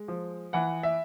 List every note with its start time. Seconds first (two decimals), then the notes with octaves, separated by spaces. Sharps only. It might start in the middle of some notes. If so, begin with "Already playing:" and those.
Already playing: G#3
0.08 F3
0.53 E3 F#5
0.83 E5